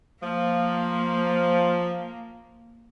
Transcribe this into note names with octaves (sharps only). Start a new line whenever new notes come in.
F3 A#3